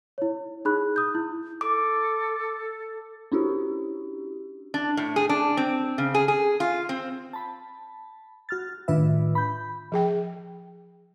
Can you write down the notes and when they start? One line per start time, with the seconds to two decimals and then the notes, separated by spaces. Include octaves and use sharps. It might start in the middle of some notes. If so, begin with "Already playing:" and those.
0.18 E4 C#5
0.65 D#4 G#4 B5 F#6
0.96 D#6 G6
1.15 E4
1.61 A4 D6
3.32 C#4 D4 E4 F#4 G4
4.74 D4
4.97 A2
5.16 G#4
5.29 D4
5.57 C4
5.98 C#3
6.14 G#4
6.28 G#4
6.60 F4
6.89 C4
7.33 A5 B5
8.49 F#4 F6 A6
8.88 A2 D#3 D4 F4 B4 E5
9.35 B5 G6
9.92 F3 G#4 G5